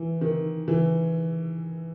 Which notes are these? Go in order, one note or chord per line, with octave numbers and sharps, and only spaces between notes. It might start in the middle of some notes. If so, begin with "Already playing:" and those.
Already playing: E3
D#3
E3